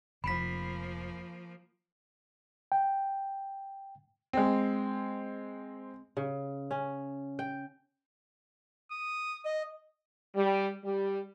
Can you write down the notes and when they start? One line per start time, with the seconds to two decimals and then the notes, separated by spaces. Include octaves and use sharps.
0.24 F1 F3 A#3 B5 B6
2.72 G5
4.33 G#3 C4
6.17 C#3
6.71 C#4
7.39 G5
8.91 D#6
9.45 D#5
10.35 G3
10.84 G3